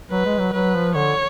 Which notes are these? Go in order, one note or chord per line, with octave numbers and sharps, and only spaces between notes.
F#3 B4
G#3
F#3
F#3 B4
F3
D3 C#5